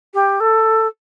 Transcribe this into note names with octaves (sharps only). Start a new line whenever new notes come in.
G4
A4